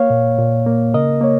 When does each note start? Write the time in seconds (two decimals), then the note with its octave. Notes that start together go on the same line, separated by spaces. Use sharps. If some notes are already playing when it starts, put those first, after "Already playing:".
Already playing: A#3 C#5 F5
0.10 A#2
0.38 A#2
0.66 A#3
0.94 C#3 A#4 D#5
1.21 A#3 C#5